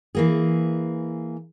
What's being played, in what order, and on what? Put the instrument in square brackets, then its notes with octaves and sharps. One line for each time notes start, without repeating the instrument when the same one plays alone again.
[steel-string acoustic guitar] E3 A#3 G#4